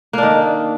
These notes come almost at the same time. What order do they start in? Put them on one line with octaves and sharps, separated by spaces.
A#3 D4 D#3